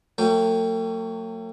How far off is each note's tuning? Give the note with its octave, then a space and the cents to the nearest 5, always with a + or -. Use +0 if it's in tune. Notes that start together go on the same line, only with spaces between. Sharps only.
F#3 -30 A3 +45 G5 +0